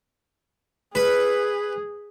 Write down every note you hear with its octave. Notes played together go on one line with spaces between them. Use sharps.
G#4 B4